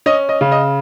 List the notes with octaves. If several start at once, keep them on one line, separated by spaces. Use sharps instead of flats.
C#4 D#5
D#5
C#3
D#5